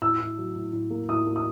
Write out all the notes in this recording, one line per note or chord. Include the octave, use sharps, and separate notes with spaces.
A2 E6
A2
F#3
A2
A2
A#3
A2 D#6
A#3
D#6